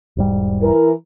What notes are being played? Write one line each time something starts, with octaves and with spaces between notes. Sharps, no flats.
E1 G#2 G3
E3 A#4